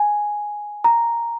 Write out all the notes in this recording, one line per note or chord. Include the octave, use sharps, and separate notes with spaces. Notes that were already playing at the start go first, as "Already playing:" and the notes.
Already playing: G#5
A#5